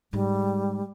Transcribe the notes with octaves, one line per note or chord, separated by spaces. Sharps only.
G#2 G3 G#3